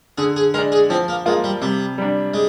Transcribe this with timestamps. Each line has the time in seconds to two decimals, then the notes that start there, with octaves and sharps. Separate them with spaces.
0.18 D3 G#4
0.36 G#4
0.54 G#3 A#4
0.58 D4
0.72 G#4
0.90 F3 C4
1.08 A#3
1.26 G#3 A#3 F4
1.44 G3
1.62 C3 G3
1.98 G3 D4
2.34 G#3